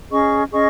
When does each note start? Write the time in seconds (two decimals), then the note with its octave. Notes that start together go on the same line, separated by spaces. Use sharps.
0.10 C#4 G#4 D#5 C#6
0.52 C#4 G#4 D#5 C#6